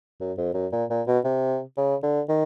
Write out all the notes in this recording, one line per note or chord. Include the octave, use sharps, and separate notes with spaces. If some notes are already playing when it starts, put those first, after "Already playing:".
F#2
F2
F#2
A#2
A#2
B2
C3
C#3
D3
D#3